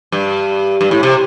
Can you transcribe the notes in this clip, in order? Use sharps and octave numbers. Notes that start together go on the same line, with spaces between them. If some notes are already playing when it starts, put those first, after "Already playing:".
G2
G2
A2
C3